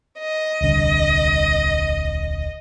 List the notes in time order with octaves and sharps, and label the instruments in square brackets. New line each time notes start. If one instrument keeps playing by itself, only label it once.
[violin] D#5
[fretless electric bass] D#1 C2 D3